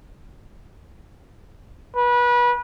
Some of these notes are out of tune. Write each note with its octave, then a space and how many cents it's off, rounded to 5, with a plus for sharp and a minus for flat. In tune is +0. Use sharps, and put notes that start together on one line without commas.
B4 -25